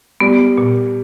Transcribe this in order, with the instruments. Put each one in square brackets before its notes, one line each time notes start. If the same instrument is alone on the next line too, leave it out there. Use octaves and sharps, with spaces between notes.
[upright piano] G3 [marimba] B3
[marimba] A#2